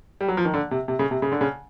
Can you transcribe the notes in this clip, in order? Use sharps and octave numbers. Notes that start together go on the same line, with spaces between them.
G3
F#3
F3
D#3
D3
C3
C3
C#3
C3
C#3
D3
C#3